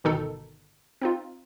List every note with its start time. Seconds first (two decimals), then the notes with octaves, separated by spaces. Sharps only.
0.04 G1 B2 D#3 D#4 A4
1.01 C4 D#4 F4